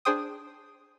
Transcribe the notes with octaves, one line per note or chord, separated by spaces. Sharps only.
D4 G#4 C5 G5 D#6